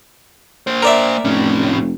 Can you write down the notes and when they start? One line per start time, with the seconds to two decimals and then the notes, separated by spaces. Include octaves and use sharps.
0.67 A#3 C5
0.83 A#4 D5 E5
1.25 F1 A2 C#4